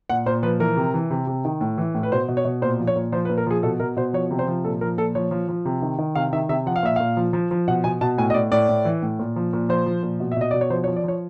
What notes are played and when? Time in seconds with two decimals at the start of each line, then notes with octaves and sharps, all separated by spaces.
0.10 A#2 F#5
0.26 A#2 C5
0.43 F3 B4
0.59 E3 A#4
0.77 C3
0.94 E3
1.11 C3
1.27 C3
1.45 D#3
1.61 A2
1.78 E3
1.94 A2
2.03 B4
2.11 B2 C5
2.28 B2
2.37 C#5
2.45 B2
2.62 A#2 C5
2.79 F3
2.87 C#5
2.96 A#2
3.12 F3 C5
3.25 B4
3.29 A#2
3.38 A#4
3.47 F3 G#4
3.63 B2 A4
3.79 B2 A#4
3.97 B2 C5
4.13 F3 C#5
4.31 C3
4.39 C5
4.48 F3
4.64 A#2 A4
4.81 F3 A#4
4.98 A#2 A4
5.15 F3 C#5
5.31 F3
5.49 F3
5.65 C3
5.82 D#3
5.99 D#3
6.15 C3 F5
6.33 D#3 E5
6.49 C3 E5
6.66 F3 F#5
6.76 F5
6.83 A#2 E5
6.96 A#2 F5
7.17 F3
7.33 F3
7.51 F3
7.68 B2 F#5
7.84 B2 G#5
8.01 B2 A5
8.18 A2 G#5
8.30 D#5
8.34 A2 D5
8.52 A2 D5
8.69 A2
8.85 E3
9.02 A2
9.19 A#2
9.36 F3
9.53 A#2
9.69 F3 C5
9.86 F3
10.03 A#2
10.20 B2
10.32 E5
10.37 B2 D#5
10.51 B2 D5
10.61 C#5
10.70 F3 C5
10.84 C#5
10.88 F3
10.96 D5
11.04 F3 C#5